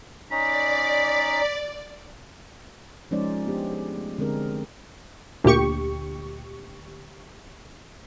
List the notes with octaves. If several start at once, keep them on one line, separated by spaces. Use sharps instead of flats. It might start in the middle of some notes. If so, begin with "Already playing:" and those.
C#4 D#4 D5 A#5 B5
F3 G#3 C#4 D#4 C5 D5
B3 D4 G4 C5
G#4
A3
D3 G#3 C4 D4 G#4 A#4
D2 A#2 G4 C#6